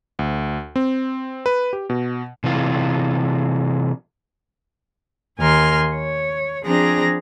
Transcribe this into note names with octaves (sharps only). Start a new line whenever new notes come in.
D2
C4
B4
G4
B2
C3 E3 F4
D#2 A#4 G#5 C6 F6
C#5
F3 C4 D4 G#4 A#5 A#6